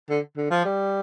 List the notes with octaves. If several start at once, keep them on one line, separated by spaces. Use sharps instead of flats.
D3
D3
F3
G3